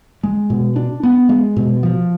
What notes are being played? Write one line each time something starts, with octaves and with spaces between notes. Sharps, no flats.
G#3
B2
D4
B3
G#3
B2
F3